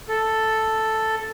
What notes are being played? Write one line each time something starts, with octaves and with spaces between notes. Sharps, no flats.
A4